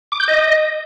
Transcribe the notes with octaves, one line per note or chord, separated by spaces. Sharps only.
D6
G6
D#5